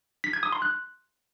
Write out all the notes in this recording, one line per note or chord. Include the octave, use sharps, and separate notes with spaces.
B6
G#6
D#6
C6
F#6